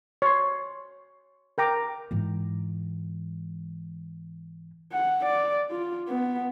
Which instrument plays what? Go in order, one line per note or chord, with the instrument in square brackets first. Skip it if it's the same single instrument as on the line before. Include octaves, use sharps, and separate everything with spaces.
[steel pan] C#5 C6
A#4 G5 A#5 D6
[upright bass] G#2 E3
[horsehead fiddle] F#5
D5
F4
B3